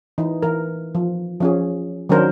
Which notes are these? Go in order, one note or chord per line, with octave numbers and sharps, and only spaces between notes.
E3 D#4
E3 A#4
F3
F3 C#4 G#4
D#3 F#3 C#4 D4 A#4 C5